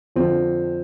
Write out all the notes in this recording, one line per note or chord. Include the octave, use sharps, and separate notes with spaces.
F2 D3 F3 C4